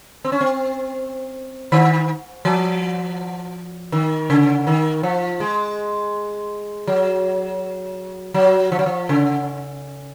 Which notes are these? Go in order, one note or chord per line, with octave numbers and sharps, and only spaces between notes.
C4
C#4
C4
D#3
F3
D#3
C#3
D#3
F3
G#3
F#3
F#3
F3
F#3
F3
C#3